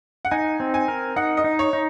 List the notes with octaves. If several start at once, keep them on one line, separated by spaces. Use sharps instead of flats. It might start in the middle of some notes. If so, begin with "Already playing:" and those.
F#5
D#4 G#5
C4
G#5
A#4
D#4 F#5
D#5
D#4
C#5
D#4